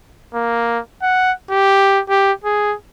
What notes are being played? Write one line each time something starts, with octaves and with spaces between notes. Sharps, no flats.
A#3
F#5
G4
G4
G#4